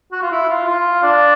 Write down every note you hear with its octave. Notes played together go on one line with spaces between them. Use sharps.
F#4
F4
E4
F4
F4
D4